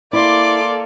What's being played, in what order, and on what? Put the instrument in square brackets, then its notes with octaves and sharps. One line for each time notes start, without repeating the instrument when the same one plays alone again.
[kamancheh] A#3 A4 [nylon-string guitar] E4 [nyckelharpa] D5 [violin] C6 D6